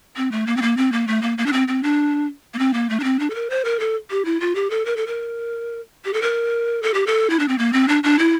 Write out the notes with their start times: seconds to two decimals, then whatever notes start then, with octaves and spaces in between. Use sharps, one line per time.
0.17 C4
0.32 A3
0.47 A#3
0.57 C4
0.62 A#3
0.77 C4
0.92 A#3
1.07 A3
1.22 A#3
1.38 A#3
1.46 D4
1.53 C4
1.68 C4
1.83 D4
2.54 A#3
2.59 C4
2.74 A#3
2.90 A3
3.00 D4
3.04 C4
3.19 D4
3.30 A4
3.35 A#4
3.50 C5
3.65 A#4
3.80 A4
4.11 G4
4.25 E4
4.40 F4
4.55 G4
4.70 A4
4.86 A#4
4.97 A4
5.07 A#4
6.05 G4
6.13 A4
6.22 A#4
6.83 A4
6.94 G4
7.07 A4
7.30 E4
7.40 D4
7.48 C4
7.58 A#3
7.73 C4
7.88 D4
8.04 D4
8.19 E4